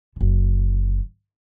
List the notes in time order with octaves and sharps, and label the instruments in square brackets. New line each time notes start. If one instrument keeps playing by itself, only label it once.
[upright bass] F#1 D3